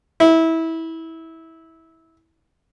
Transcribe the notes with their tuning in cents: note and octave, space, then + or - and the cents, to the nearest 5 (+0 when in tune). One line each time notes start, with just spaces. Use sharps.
E4 -20